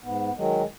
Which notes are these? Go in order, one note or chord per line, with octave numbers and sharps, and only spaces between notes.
G#2 B3
D#3 F#3 G#3